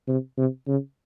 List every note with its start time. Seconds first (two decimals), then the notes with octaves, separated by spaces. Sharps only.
0.08 C3
0.38 C3
0.68 C#3